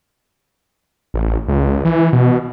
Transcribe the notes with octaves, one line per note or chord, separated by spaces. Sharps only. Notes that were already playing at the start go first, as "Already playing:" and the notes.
A1
C#2
E3
B2